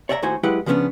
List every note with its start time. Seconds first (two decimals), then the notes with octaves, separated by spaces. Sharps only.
0.09 C#5 D5 E5 F#5 A#5
0.22 D#2 A2 D#4 F#4 C5 G#5
0.43 F#3 G#3 E4 G4 B4 F#5
0.66 C#3 F3 G3 B3 C#4 D4